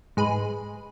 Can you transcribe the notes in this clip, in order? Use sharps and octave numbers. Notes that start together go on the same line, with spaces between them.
G#2 G#4 B4